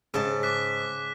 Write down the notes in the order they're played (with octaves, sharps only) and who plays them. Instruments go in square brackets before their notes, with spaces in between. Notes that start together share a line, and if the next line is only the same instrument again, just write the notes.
[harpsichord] G#2 [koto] C#3 A5
[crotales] D6 F#6 B6